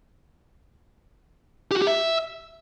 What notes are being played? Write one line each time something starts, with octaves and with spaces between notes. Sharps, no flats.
G4
F#4
G4
E5